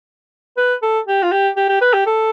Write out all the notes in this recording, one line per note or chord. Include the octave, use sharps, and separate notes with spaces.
B4
A4
G4
F4
G4
G4
G4
B4
G4
A4